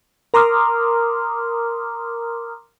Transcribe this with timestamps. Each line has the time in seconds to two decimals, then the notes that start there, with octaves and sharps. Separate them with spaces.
0.34 A#4 A#5 C6 D6 D#6 F6